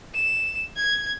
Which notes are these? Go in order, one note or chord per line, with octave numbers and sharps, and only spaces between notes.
E7
G#6